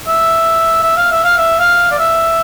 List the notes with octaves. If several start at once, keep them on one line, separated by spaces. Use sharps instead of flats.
E5
E5
F5
E5
F5
E5
F5
D5
E5